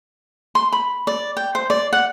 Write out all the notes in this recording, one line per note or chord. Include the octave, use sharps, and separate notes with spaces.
C6
B5
D5
G5
C5
D5
F#5